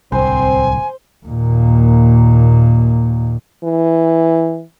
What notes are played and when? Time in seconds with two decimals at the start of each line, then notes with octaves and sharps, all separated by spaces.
0.12 D1 C2 C4 C5 G#5
1.26 D#2 A#2
3.64 E3